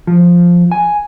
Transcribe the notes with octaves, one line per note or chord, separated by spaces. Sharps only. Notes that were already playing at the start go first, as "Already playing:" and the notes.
F3
G#5